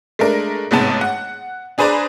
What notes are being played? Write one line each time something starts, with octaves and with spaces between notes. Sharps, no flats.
G#3 A3 D4 A#4
A1 G#2 C3 B3 A5
F#5
D4 G#4 B4 C5 D5 A#5